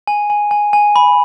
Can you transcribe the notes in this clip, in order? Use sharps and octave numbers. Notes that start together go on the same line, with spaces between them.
G#5
G#5
G#5
G#5
B5